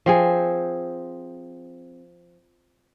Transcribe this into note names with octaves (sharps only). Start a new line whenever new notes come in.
F3 C4 G#4